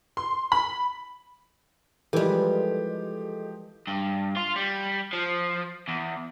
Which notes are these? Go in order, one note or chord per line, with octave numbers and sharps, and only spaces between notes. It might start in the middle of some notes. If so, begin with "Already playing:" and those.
C6
B5
E3 F3 G3 G#3 G4 A4 A#4 D#5
G2
F4
G3
F3
E2